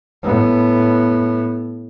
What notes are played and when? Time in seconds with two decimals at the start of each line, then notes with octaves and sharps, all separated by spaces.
0.23 A2 B3